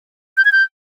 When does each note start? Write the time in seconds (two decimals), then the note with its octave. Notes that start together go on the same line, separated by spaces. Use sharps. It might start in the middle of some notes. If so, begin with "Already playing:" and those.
0.37 G6
0.45 G#6
0.52 G6